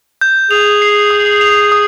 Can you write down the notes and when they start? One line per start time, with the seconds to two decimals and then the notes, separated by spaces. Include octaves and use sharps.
0.21 G6
0.51 G#4 F7
0.82 C7
1.11 D#6
1.41 F7
1.72 D#6